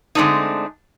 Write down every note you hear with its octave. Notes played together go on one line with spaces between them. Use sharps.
D3 G#3 A3 C4 D4 D#4